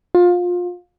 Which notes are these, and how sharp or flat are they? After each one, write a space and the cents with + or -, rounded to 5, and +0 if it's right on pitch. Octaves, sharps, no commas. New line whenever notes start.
F4 +25